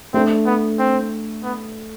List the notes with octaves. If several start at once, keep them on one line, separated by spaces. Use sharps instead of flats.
A3 C4 D4 A4
B3
C4
B3